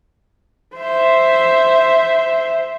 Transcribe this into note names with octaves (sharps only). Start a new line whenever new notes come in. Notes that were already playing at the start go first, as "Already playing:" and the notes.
C5 E5